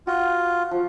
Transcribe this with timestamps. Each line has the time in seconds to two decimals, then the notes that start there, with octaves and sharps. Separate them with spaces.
0.07 F4 F#4
0.71 F3